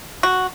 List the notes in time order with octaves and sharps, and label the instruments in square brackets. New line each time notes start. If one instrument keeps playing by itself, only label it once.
[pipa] F#4